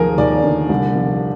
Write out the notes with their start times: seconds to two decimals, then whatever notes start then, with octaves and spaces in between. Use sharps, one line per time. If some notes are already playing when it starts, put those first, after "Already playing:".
Already playing: D#2 F3 G#4 A#4
0.18 D#2 D5
0.44 D3
0.69 C2
0.95 F3